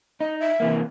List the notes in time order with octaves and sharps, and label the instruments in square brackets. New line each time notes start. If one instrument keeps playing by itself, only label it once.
[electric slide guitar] D#4 [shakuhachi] D#5
[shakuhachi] E5
[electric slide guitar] C3 E3 A#3